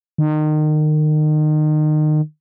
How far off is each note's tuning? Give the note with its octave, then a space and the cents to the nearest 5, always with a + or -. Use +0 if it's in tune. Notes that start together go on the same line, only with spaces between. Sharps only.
D#3 -30